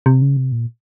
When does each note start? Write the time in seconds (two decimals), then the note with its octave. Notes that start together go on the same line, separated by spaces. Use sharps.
0.06 C3
0.22 C#3
0.37 C3
0.52 A#2